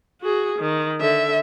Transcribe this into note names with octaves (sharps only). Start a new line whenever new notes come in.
F#4 G#4
D#3
D3 E5